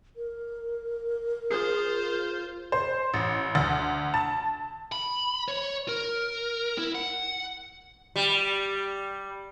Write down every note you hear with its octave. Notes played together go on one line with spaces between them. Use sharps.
A#4
F4 G#4 C5
C5
A1
D2
A5
B5
C#5
A#4
E4
F#5
G3